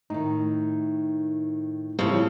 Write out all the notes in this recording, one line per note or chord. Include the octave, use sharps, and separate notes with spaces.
A2 D#3 D#4
A2 C#3 E3 F3 G3 C4